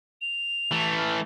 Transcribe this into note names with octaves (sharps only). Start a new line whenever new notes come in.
F7
E3 A3
F6